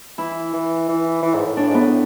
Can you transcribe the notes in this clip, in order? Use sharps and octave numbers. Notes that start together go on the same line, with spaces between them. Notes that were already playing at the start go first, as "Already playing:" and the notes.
E3 E4
E3
E3
E3
G#2
A2
A2 D4
G#2
B3
A2